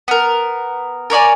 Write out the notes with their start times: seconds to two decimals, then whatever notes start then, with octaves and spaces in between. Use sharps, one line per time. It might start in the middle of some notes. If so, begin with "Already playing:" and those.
0.08 B3 A#4
1.10 A#4 C#5 D5 G#5